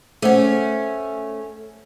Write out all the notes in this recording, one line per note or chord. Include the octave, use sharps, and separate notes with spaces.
A3 C#4 G#4 C5 F#5